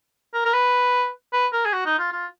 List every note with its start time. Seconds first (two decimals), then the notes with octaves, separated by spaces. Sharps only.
0.34 A#4
0.45 A#4
0.53 B4
1.33 B4
1.53 A#4
1.66 G#4
1.73 F#4
1.86 D#4
1.99 F4
2.12 F4